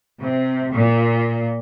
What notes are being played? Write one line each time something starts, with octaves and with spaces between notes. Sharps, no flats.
C3
A#2